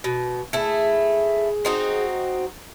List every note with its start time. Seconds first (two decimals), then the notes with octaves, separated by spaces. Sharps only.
0.04 B2
0.53 A3 E4 G#4
1.65 C4 D#4 F#4